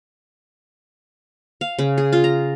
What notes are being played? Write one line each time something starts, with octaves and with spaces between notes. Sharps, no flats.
F5
C#3
G#4
F4
A#5